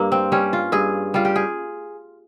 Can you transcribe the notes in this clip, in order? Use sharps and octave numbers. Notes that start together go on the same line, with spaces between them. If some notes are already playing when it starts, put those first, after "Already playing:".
Already playing: G2 A#3
C4
G3 C#4
F4
G2 G#4
G3 F4
G4
G#4